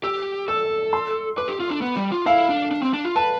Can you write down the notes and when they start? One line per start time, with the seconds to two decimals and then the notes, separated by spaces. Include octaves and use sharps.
0.03 G4 E6
0.48 A4 E6
0.93 C6
1.37 B4 D6
1.48 G4
1.60 F4
1.70 D4
1.82 B3
1.97 G3
2.12 F4
2.26 E4 F5
2.49 D4
2.71 D4
2.82 C4
2.94 D4
3.05 F4
3.15 B4 A5